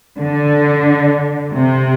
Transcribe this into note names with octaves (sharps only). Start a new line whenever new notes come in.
D3
C3